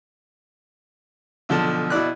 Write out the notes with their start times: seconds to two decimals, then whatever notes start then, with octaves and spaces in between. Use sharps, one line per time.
1.49 B1 D3 F3 A5
1.90 B2 E4 D5 F#6